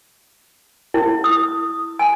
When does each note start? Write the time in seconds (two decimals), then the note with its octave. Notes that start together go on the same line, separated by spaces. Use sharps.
0.94 E4
1.24 D#6
1.99 G#5